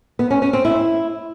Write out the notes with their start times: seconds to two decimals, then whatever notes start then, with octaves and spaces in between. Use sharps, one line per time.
0.19 B3
0.31 C#4
0.42 C#4
0.53 C4
0.65 E4